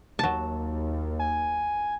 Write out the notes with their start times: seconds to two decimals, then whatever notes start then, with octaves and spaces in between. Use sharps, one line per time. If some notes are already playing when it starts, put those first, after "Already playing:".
0.19 D#2 F#3 A5
1.19 G#5